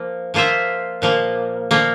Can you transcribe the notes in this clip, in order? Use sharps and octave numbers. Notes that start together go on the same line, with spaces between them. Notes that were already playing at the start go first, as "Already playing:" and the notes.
Already playing: F3 A#3
F3 A#3 F4 C5 E5
A#2 F3 A#3
A#2 F3 A#3